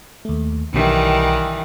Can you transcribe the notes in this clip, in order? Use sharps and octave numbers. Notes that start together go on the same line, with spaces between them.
D#2 A3
B1 D#3 E3 G3